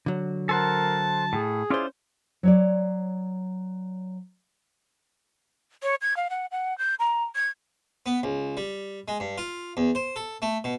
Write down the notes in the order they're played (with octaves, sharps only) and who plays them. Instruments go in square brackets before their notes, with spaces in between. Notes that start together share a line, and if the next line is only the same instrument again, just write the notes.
[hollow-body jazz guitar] D3 F#3
[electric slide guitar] A4 C5 F#5 [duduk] A#4 [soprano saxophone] A5
[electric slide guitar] A2 [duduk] G#4
[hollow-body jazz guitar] C#4 C5 [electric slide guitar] E4 F4 D5
[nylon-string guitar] F#3 C#5 D5
[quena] C#5
G#6
F5
F#5
F#5
G6
A#5
G#6
[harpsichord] B3
C#2
G3
G#3
G2
F4
E2
C5
A4
A3
B2